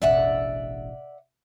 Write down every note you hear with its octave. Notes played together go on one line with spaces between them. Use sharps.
E1 A1 D5 E5 F#5